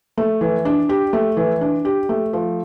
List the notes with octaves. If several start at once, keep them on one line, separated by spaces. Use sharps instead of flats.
A3
E3
D4
G4
A3
E3
D4
G4
A3
F3